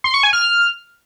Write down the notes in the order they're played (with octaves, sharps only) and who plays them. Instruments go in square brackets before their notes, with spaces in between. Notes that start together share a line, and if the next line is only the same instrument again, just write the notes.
[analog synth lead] C6
C#6
G#5
F6